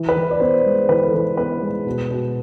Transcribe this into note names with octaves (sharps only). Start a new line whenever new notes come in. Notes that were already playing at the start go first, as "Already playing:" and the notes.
Already playing: E3
B4
E3
D5
B3 C5
G#3
E3 B4
A4
E3
B3 B4
G#3
B2
B2